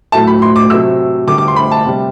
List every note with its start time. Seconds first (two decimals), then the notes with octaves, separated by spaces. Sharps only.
0.12 A2 F#3 A3 A5
0.27 B5
0.42 C6
0.56 D6
0.70 C3 F#3 A3 E6
1.27 D3 G3 D6
1.38 D6
1.48 C6
1.56 B5
1.71 A5
1.85 C3 G3